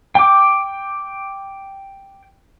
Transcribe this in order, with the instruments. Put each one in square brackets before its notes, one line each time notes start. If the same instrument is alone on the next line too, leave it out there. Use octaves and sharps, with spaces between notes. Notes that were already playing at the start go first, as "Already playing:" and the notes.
[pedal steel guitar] G5 D6